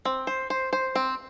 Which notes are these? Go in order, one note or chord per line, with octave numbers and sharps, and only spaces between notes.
C4
C5
C5
C5
C4